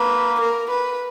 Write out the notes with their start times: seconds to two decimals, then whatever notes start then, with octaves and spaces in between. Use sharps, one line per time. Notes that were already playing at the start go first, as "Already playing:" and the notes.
Already playing: A#3 B4
0.41 A#4
0.71 B4